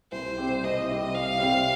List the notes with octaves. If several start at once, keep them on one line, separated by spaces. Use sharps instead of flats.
C2 C5
C3 G3 C4 G4
C2 D#5
C3 G3 C4 G4
C2 F5
C3 G3 C4 G4